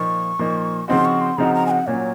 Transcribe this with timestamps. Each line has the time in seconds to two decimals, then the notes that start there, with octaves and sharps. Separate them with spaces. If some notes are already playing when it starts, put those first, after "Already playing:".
Already playing: A#2 F3 A#3 D#4 C#6
0.39 A#2 F3 A#3 D#4
0.88 C#3 F3 C4 D#4 F#4 C6
1.05 C#6
1.21 C6
1.38 C#3 F3 C4 D#4 F#4 A#5
1.54 A#5
1.66 G#5
1.71 F#5
1.87 A#2 F#3 C#4 C#5